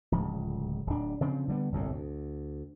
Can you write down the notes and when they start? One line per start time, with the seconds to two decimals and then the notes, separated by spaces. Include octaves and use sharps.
0.12 D1 C#2 F3
0.87 D1 D4
1.21 C#3 F3 C4
1.48 D3 G3 B3
1.72 G1 C2 F#2 A2
1.92 D2